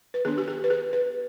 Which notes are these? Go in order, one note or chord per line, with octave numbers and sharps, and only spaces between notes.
B4
D#3 B3 D4 G#4
G4
G#4
B4
G#4
B4